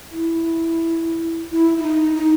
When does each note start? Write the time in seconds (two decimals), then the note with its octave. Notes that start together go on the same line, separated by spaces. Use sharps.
0.12 E4
1.51 E4
1.77 E4
1.83 D#4
2.15 D#4